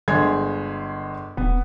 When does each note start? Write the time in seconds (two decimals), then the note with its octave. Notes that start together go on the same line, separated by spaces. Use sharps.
0.08 G1 D3 G#3 G#6
1.37 D#1 B3